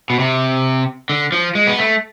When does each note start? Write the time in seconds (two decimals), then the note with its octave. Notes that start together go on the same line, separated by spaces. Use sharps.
0.10 B2
0.19 C3
1.10 D3
1.32 F3
1.55 G#3
1.67 B3
1.79 A3